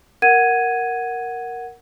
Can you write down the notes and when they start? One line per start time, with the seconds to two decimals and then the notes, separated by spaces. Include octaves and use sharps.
0.22 A#4 F#5 G#6 D#7